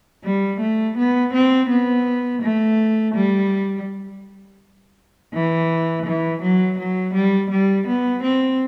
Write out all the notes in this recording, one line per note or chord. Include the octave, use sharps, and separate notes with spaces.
G3
A3
B3
C4
B3
A3
G3
E3
E3
F#3
F#3
G3
G3
B3
C4